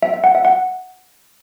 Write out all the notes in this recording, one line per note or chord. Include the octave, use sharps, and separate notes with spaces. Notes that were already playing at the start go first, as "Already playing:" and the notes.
E5
E5
F#5
E5
F#5